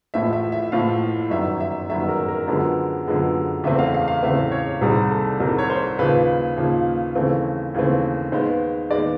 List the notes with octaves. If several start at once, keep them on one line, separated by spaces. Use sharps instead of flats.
A1 A2 F3 E5
E5
E5
A1 A2 F3 F5
G1 F#2 D#3 E5
E5
G1 F#2 D#3 E5
A#4
A#4
F#2 D3 F3 G#3 B3
F#2 D3 F3 G#3 B3
E2 C#3 E3 A3 C4 E5
F5
F5
F5
E2 C#3 E3 A3 C4 E5
C#5
C2 C3 D#3 G3 G#4
A4
C2 C3 D#3 G3 A#4
C#5
C5
D#2 C#3 F3 A#3 B4
D#2 C#3 F3 A#3
D#2 C#3 E3 A3 C4
D#2 C#3 E3 A3 C4
D#2 D#3 G#3 B3 C5
D#2 D#3 G#3 B3 D5